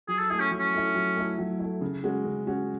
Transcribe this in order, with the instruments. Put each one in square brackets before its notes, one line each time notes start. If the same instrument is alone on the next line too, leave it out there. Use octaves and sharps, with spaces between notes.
[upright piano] F#3 [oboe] G#4
[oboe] A4
[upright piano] A3 E4 [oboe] G#4
[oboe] C#4
[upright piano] F#3
[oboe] C#4
[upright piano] A3 E4
F#3
A3 E4
F#3
A3 E4
C#3
G#3 C#4 F#4
C#3
G#3 C#4 F#4